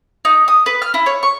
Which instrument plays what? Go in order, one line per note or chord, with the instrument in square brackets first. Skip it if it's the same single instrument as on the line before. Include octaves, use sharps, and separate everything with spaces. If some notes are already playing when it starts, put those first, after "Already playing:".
[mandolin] D#4
D#6
B4
F6
E4
C#5
C#6